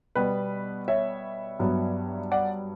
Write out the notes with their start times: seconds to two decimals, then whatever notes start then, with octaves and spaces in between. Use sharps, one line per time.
0.15 B2 G3 B3 B4
0.88 C#5 E5
1.59 G2 F#3 B3
2.32 D5 F#5